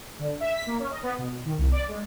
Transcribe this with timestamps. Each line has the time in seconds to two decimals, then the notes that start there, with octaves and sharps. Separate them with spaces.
0.19 D3
0.40 E5
0.54 B6
0.67 A#3
0.79 C#4
0.91 D#5
1.03 B3
1.18 B2
1.45 D#3
1.58 C2
1.72 D5
1.88 G#3